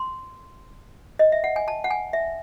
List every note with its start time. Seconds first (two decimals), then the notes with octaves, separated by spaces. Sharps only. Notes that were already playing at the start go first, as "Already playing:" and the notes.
Already playing: C6
1.19 D#5
1.32 E5
1.44 F#5
1.56 G#5
1.68 A5
1.84 F#5
1.91 G#5
2.13 E5